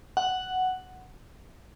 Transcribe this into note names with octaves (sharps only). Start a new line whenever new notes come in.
F#5